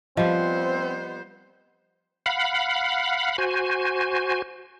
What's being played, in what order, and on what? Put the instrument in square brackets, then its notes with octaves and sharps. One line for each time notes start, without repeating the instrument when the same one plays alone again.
[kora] F3 G3 [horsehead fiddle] B3 C5 [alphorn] C4 [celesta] D#5
[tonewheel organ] F5 F#5 B5
F#4 C5 G#5